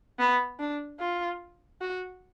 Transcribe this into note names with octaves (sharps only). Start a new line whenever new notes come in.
B3
D4
F4
F#4